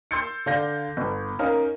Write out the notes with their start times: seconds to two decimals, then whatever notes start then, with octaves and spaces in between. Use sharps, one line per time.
0.11 C6 E6 G6 A6 C#7
0.46 D3 D5 F5 G6 A#6
0.97 G1
1.39 C#4 D#4 A#4 F5